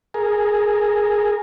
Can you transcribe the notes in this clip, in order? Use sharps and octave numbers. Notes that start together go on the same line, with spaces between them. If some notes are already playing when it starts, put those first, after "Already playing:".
G#4 A#4